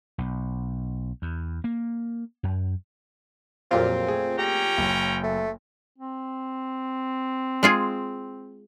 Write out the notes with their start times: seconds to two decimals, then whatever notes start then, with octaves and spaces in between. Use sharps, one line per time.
0.18 B1
1.22 E2
1.64 A#3
2.43 F#2
3.71 F2 A#2 F#3 C4 F4 G4
4.07 A3 G#4
4.39 C#4 G4 G5 A#5
4.77 F#1
5.24 A3
5.98 C4
7.63 G#3 F4 G#4